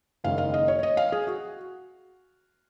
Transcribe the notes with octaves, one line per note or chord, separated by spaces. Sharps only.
F#1 F#2 D#3 G#3 F5
F5
D#5
C#5
C#5
D#5
F5
G#4
F#4